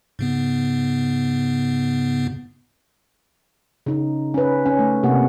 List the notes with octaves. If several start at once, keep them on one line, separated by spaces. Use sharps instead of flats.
G#2 C#3 B3
C#3 D#4
C#4 B4
C#4
A3
C3 A#3 F#5